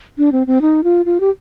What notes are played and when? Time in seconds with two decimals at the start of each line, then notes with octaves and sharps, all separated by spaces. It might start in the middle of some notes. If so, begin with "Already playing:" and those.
0.18 D4
0.32 C4
0.47 C4
0.61 D#4
0.84 F4
1.06 F4
1.20 G4